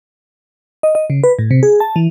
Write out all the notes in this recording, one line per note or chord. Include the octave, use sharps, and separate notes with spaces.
D#5
D#5
C#3
B4
A2
C3
G#4
A5
E3